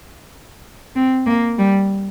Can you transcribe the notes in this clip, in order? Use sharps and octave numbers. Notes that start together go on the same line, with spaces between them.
C4
A#3
G3